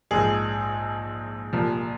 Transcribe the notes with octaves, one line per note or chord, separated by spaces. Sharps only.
A#1 G#2 F3 G#4
C2 A#2 F3